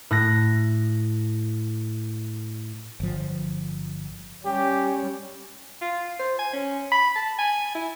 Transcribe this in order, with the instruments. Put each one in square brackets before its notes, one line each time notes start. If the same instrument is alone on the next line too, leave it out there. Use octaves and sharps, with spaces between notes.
[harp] A2 F#6 A#6
[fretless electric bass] G1 F3
[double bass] G3 C#4 [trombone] G4
[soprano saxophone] F4
C5
G#5
C#4
B5
A5
G#5
E4